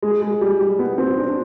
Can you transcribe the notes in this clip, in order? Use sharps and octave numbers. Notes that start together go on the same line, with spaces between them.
G#3
G#3
G3
G3
B3
C4
D4
D4